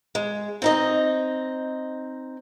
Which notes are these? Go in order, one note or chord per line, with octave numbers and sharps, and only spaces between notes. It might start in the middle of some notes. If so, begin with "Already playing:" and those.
G#3
C4 D#4 D#5